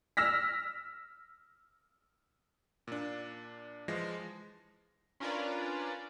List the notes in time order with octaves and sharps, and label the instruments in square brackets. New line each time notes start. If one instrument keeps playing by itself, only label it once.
[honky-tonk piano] E6 F6 A#6 B6
[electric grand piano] A#2 D4
E3 F3 G#3 A#6
[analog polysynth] C#4 D4 F4 A#4 B4 D5